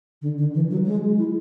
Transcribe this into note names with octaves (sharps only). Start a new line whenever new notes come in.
D3
D3
E3
F#3
G#3
E4